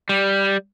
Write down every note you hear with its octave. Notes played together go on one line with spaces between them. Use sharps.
G3